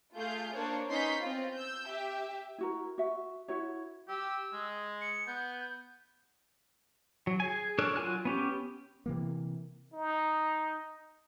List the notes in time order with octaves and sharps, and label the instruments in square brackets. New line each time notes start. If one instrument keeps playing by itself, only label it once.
[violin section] A3 F4 G#4 F5 G6
A#3 D4 C5 C#5
B3 C#4 D#4 C6 G6 B6
C4 F4
E6 G6
G4 E5
[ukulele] E4 F#4 A#4
F#4 E5
E4 F#4 C#5
[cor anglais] G4 [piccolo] E6
[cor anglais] G#3
[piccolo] C#7
[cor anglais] B3 [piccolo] G6
[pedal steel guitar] F#3
G#4 G#5
D4 A4 A#4 C#5 F#6
F#3 F4 G#5 F#6
B3 C#4 G4
[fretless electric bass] C3 E3 A#3
[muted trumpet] D#4